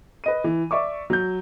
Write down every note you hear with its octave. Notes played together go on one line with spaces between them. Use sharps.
B4 D#5 D#7
E3
D5 E5 C#6 D6
F#3 G6